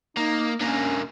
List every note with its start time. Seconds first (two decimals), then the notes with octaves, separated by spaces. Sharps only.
0.17 A#3 D#4
0.61 D3 A#3 C#4